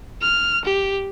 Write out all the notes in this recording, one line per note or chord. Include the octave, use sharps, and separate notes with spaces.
F6
G4